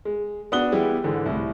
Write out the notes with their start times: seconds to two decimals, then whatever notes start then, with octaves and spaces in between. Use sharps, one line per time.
0.05 G#3
0.52 B3 D4 F#4 D#6 F#6 G7
0.72 E3 G3 G#3 B3 E4 G4
1.04 G#2 D3 E3
1.26 C2 A2